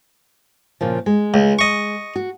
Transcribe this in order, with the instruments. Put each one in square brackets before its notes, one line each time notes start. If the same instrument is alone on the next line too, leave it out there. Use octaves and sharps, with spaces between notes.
[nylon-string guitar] A#2 C#3 F3
G#3
[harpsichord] C#2
D#5 C#6
[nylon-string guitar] F#4